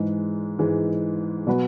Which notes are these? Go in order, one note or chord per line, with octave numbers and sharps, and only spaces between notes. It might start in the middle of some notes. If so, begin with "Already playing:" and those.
Already playing: G#2 E3 G#3
G#2 E3 G#3
B2 F#3 B3 F#4 B4